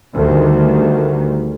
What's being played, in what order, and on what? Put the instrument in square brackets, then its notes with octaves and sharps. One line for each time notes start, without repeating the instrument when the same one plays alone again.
[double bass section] D2 D#3 G3